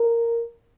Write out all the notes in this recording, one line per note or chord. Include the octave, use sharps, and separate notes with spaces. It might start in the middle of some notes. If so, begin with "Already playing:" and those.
Already playing: A#4